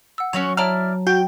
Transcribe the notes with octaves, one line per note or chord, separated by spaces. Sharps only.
F#5 E6
F#3 C#4 F#4 C#5
E4 C#5 D5 A5 A#5 F6
F#4 G5